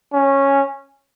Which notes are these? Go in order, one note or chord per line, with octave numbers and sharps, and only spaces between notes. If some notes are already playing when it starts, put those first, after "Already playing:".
C#4